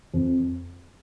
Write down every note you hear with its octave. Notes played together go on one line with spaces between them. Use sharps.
F2